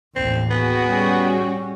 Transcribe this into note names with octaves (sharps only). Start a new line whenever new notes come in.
A1 D#2 C4
B3 F#4 G#4 G5
G3 C#4